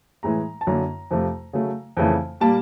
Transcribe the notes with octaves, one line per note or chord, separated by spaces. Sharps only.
A2 E3 G#3 A#5
A5
F#2 D3 F#3 A#3 A#5
F2 C3 F3 A3
C#3 F#3 A3
F2 C#3 E3 A3
A#2 G3 A#3 A5